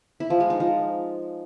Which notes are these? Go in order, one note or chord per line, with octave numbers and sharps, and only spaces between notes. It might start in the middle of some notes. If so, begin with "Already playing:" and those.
E4
F3
G#3
D#4
F3